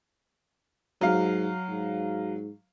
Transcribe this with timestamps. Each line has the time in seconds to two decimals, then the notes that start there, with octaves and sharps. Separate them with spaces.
1.01 G#2 F#3 F5
1.69 G#2